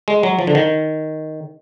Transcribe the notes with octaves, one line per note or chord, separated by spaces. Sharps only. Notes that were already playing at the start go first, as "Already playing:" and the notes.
G#3
F#3
F3
D3
D#3